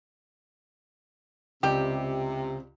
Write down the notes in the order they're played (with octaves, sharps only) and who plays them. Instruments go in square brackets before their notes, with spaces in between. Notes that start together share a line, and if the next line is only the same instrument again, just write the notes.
[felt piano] C#2 [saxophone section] C3 [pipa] G3 G4